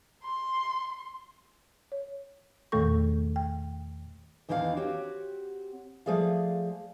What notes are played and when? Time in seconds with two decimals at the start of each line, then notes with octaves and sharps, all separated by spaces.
0.23 C6
1.92 C#5
2.72 E2 A#2 D#3 A3 A4 C#6
3.36 G5
4.49 E2 D#3 E3 D4 B4 F5
4.77 C4 F#4 G4 C#5
6.06 F3 A3 G#4 D5 F5